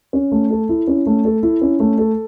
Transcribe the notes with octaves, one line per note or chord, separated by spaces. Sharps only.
C#4
A3
A4
E4
C#4
A3
A4
E4
C#4
A3
A4